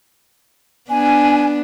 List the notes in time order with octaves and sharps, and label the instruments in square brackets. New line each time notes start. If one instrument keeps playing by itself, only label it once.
[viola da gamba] B3 D4 [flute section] G#5